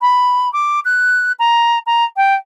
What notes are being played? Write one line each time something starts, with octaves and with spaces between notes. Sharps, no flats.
B5
D6
F#6
A#5
A#5
G5